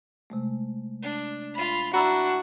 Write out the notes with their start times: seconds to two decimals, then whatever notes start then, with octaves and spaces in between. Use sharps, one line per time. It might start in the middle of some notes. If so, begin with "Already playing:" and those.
0.30 C3 G#3 A3
1.02 D4
1.54 F4 B5
1.93 D4 E4 F#4 A#5 B5 E6